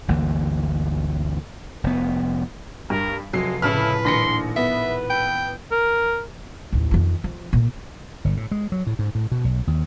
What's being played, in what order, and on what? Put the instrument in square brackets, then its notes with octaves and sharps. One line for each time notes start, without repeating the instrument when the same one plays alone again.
[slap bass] G1 D2 E3 A#3
F1 B3
[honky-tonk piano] G2 [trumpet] A#4
[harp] F1 [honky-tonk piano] F#3 C7 [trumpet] G#3
[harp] A2 [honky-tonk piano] C#3 A5 F6 [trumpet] E4 [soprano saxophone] B4
[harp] D#1 [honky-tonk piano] A#1 A#6 C#7 [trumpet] C6
[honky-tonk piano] B3 [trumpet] B4 [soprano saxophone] E5
[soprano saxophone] G5 [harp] B5 E6
[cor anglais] A#4
[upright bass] A1 D#2
F2 D#3
F3
A#2
[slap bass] G1
A2
G#3
F#3
A2
G#2
A2
B2
B1
D#2